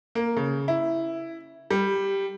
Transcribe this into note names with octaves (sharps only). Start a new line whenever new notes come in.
A#3
C#3
E4
G3